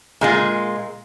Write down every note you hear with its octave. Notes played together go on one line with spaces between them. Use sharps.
A#2 G#3 F4